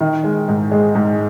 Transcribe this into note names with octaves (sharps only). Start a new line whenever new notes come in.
D#3
G#3
G#2
G#3
G#2